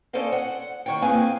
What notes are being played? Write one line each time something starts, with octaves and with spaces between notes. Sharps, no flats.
C#4 A4 C5 D5 D#5 F5
F#5
D#3 C#5 G5
A#3 C4 G#4 B4 F5 G#5